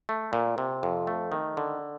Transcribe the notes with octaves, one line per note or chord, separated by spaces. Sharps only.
A3
A#2
C3
F2
A3
D#3
D3